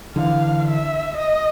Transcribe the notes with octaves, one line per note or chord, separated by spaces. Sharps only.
D3 E3 F5
E5
D#5